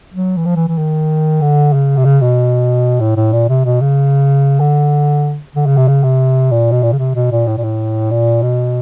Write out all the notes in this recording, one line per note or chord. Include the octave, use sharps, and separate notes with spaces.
F#3
E3
F3
E3
E3
D#3
D3
C#3
C3
C#3
B2
A2
A2
A#2
C3
B2
C#3
D3
D3
C#3
C3
C#3
C3
A#2
B2
A#2
C#3
C3
B2
A#2
A2
A#2
A2
A#2
B2